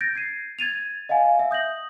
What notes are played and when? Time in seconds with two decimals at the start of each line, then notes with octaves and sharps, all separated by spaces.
0.01 G6 A6 A#6 D7
0.15 G#6 C7 D#7
0.59 G#6 A6 D#7 F7
1.09 D#5 F5 F#5 G#5
1.39 E5
1.51 D#6 G6 A#6 F#7